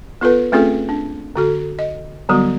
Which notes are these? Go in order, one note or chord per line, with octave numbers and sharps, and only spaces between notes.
B3 F4 A4 B4
A3 C4 C#4 F4 G#4 A4
D4
D3 F#4 A4
D#5
D3 F#3 G3 B3 F#4